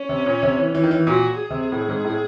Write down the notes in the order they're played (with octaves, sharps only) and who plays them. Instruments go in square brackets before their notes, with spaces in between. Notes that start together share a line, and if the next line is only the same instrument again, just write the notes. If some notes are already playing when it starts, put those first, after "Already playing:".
Already playing: [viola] C#4
[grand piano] C3
A#2
C3
E3
E3
D#3
E3
[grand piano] A#2 [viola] F#4
[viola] G#4
[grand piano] C3
A2
G#2
A2